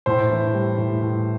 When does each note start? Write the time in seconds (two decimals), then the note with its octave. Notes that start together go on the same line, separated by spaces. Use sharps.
0.06 A2 C5
0.30 E3
0.53 G3
0.78 A2
1.01 A2